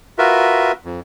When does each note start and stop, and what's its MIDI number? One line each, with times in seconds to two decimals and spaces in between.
0.18 0.72 65
0.18 0.72 66
0.18 0.72 70
0.18 0.72 71
0.18 0.72 76
0.85 1.00 41